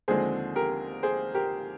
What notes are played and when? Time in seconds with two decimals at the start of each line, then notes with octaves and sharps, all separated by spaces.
0.08 D#2 D3 F3 G#3 C4 G#4 C5
0.55 G4 A#4
1.03 G#4 C5
1.35 G4 A#4